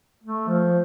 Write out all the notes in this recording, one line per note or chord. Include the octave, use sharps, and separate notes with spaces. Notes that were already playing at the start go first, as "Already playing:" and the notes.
A3
F3